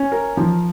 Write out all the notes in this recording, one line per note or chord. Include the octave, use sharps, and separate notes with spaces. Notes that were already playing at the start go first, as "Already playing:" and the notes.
Already playing: C#4
A#4
F3